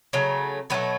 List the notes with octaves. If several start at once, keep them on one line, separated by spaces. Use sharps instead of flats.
C#3 F#3 A3
B2 F#3 A3 B3